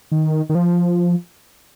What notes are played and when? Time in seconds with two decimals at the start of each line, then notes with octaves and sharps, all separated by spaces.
0.12 D#3
0.49 D#3
0.55 F3